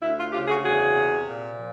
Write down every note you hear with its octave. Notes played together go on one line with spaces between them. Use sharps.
D2 E4
F4
C#3 F4 G4
F#4 G#4
E2 F#4 G#4
C3
A#2
F3